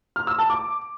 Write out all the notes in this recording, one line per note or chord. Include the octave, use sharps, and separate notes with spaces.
F6
E6
A5
D6